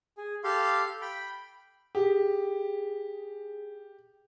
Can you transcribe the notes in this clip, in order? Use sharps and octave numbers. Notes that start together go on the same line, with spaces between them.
G#4
G4 A4 F5 C6
G5 B5
G4 G#4